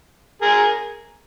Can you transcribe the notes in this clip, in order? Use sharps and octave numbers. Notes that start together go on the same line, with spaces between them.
G#4 A#4